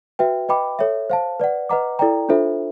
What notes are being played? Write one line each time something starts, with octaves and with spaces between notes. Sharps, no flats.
F#4 B4 E5 G5
B4 D#5 G5 B5 D6
A4 C#5 E5
C5 F5 A5
B4 D5 F#5
B4 D#5 F#5 A#5 D6
E4 A4 D5 G5 A#5
D4 F4 A4 C5 E5